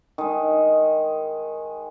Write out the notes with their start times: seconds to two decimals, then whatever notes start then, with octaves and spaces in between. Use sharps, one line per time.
0.18 D#3 G#3